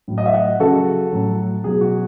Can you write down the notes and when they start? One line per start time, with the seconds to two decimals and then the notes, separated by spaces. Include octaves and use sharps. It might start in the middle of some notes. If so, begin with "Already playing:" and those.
0.08 A2 F#3
0.18 D#5
0.26 E5
0.34 D#5 F#5
0.60 C#3 F#3 F#4 A4
1.12 A2 F#3
1.64 B2 F#3 G#4
1.81 F#4